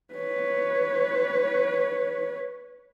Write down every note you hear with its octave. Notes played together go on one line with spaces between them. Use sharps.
B4 C#5